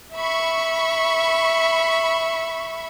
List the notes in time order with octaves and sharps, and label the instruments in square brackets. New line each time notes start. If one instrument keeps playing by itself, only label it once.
[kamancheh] E5 [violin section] B5 C#6